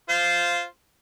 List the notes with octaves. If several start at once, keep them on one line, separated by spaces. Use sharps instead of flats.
F4 C5